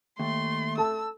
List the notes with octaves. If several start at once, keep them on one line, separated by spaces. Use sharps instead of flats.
D#2 A3 C6
A4 A5 E6